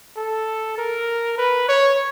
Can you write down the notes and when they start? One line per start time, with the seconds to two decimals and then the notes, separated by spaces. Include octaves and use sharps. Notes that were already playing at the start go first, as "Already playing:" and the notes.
0.16 A4
0.78 A#4
1.38 B4
1.68 C#5